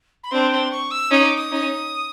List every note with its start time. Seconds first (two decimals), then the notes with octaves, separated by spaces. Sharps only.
0.24 B5
0.30 C4 D4 C6
0.51 C6
0.71 C#6
0.91 E6
1.11 C#4 D#4 D#6
1.24 D6
1.37 D#6
1.51 C#4 D#4